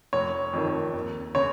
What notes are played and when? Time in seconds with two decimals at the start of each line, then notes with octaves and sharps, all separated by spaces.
0.13 F1 C#5
0.53 F2 D#3
0.94 D#2
1.35 C#3 C#5